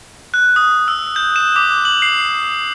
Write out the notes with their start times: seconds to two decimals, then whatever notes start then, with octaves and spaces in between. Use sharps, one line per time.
0.34 F#6
0.56 D#6
0.88 E6
1.16 G6
1.36 E7
1.56 D6
1.85 F#7
2.02 C7